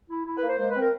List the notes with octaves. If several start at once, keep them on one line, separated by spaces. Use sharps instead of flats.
E4
E4
B4
A#3
C5
G#3 C5
B4
C4 A#4